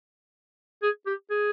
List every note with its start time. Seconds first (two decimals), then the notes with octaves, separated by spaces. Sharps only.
0.82 G#4
1.06 G4
1.30 G#4